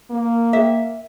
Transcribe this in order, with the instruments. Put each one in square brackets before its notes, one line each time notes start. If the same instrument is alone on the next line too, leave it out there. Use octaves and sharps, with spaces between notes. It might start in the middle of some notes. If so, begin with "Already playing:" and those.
[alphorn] A#3
[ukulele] E5